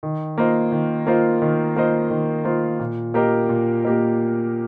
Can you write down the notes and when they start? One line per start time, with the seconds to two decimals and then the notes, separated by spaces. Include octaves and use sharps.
0.03 D#3
0.38 A#3 F4 C5 D#5
0.72 D#3
1.07 A#3 F4 C5 D#5
1.42 D#3
1.76 A#3 F4 C5 D#5
2.10 D#3
2.44 A#3 F4 C5 D#5
2.80 A#2
3.14 A#3 G4 A#4 D#5
3.49 A#2
3.84 A#3 G4 A#4 D#5